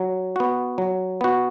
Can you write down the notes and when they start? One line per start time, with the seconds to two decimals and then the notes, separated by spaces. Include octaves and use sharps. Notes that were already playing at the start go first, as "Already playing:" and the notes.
Already playing: F#3
0.36 B3 F#4
0.78 F#3
1.21 B3 F#4